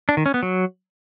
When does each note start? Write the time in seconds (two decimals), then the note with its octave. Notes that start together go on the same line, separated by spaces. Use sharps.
0.09 D4
0.17 D#3
0.26 C#4
0.34 B3
0.43 F#3